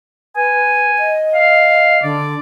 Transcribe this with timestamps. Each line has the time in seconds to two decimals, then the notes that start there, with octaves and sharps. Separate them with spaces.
0.36 B4 G#5
0.99 D#5
1.34 F5
2.03 D3 D5